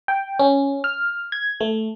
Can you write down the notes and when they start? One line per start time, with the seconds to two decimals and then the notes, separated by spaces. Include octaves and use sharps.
0.08 G5
0.39 C#4
0.84 F6
1.32 G#6
1.60 A3